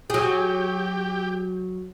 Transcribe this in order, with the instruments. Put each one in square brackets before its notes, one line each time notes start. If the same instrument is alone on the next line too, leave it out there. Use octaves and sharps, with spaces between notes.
[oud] F#3 G#4 [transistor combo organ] G4